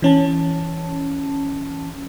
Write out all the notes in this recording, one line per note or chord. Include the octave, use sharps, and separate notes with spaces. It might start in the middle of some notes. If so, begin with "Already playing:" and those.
E3 C#4 A5